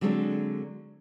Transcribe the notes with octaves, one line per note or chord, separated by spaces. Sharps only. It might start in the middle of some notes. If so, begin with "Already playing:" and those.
D3 F#3 G#3 C4 D4 A4